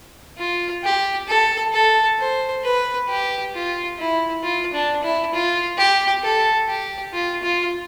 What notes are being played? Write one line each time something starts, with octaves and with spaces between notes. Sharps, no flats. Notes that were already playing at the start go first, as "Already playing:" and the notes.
F4
G4
A4
A4
C5
B4
G4
F4
E4
F4
D4
E4
F4
G4
A4
G4
F4
F4